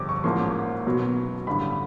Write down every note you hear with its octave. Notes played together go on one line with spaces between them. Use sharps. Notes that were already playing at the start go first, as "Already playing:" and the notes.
Already playing: G1 F2 D3 G3 D6
C#6
A1 G#2 F3 A#3 C6
B1 B2 F#3 B3
A1 G2 D3 B5